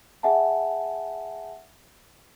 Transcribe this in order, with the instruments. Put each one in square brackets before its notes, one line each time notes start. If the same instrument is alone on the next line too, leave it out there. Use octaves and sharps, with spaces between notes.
[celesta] G#4 E5 F#5 G#5 A5